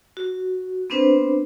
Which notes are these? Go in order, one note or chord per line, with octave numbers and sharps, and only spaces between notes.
F#4
B3 C4 D4 B4 C5